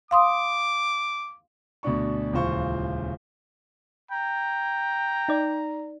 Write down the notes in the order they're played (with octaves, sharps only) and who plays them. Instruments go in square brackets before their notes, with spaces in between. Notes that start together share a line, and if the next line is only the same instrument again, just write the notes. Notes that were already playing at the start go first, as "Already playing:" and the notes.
[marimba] F5 C6 D#6 [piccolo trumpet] D6
[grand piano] D2 B2 D4 C#6
D#1 C#2 E3 F4 C5 C#6
[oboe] G5 [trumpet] A#5
[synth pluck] D#4 D5